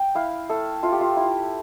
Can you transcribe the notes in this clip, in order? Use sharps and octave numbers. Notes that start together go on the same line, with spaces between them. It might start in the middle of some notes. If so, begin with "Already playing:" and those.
Already playing: G5
E4 F5
A3 A4
A3 F4
G4
F4
E4